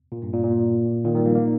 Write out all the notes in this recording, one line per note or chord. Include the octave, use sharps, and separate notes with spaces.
A#2
G2
A#2
A#2
A#2 D#3
D#3 G3
F3 A#3
A#3 D#4